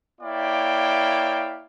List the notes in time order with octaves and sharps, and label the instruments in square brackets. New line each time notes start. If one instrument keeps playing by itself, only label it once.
[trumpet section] A#3 E4 C#5 D5 F5 G5